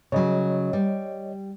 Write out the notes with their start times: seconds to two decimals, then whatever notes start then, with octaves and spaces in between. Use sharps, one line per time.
0.12 C#3 F#3 C#5 D#5
0.73 G3